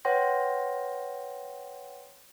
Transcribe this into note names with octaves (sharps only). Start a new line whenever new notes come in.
B4 C#5 F#5 G5 C6 A#6